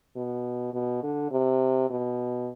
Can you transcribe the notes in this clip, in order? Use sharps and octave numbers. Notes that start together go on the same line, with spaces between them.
B2
B2
D3
C3
B2